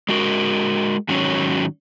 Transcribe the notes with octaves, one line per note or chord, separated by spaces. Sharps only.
G#3 F#4 A#4
G#2 D#3 F#3 C#4